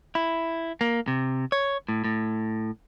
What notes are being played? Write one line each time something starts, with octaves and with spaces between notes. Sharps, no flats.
E4
A#3
C3
C#5
A2
A2